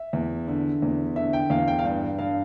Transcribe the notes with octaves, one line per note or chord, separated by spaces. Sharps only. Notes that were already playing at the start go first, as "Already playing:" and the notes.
Already playing: E5
E2
D3
E2
D3 E5
G5
E2 F5
G5
F5
G2 G5
G2 F5